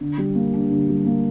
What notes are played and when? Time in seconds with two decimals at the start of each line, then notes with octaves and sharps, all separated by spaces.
0.01 D3
0.18 G3
0.35 A#3
0.53 D4
0.71 D3
0.88 G3
1.06 A#3